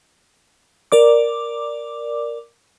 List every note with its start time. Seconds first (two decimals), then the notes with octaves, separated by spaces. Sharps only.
0.92 A#4 D5 D6